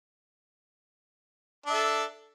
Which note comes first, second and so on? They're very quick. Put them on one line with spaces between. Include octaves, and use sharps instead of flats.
D4 E5 A4